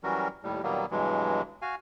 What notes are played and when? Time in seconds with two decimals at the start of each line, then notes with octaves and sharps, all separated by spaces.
0.03 E3 F#3 G3 C#4 F#4 A#4
0.43 D#2 A2 G3
0.63 A#2 D#3 F#3 G3 A#3 B3
0.91 G2 B2 E3 F#3 G#3
1.62 F#4 F5 G#5